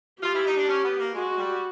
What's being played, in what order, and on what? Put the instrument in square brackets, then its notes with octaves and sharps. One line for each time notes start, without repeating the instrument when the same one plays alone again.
[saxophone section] F4 [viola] G4
[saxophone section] E4
D#4
D4
C#4
B3
A#3
[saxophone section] G#3 [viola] F#4
[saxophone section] G3